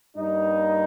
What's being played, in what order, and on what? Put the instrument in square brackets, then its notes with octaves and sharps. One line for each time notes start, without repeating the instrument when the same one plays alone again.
[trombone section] G2 G3 A#3 D#4